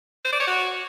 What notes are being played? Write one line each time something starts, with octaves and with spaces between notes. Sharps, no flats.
C5
D5
C#5
F#4